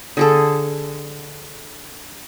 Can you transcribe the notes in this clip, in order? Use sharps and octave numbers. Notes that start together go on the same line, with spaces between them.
D3 G#4 A4